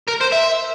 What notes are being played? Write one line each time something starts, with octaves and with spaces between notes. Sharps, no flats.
A#4
C5
E5